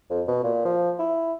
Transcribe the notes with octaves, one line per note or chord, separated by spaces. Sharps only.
F2
B2
A#2
F3
E4